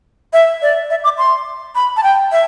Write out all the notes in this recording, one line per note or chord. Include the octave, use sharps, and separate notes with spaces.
E5
D5
E5
D6
C6
B5
A5
G5
E5